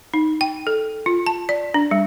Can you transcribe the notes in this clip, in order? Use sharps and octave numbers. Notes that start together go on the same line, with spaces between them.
D#4
G5
A4
F4
A5
D5
D4
G3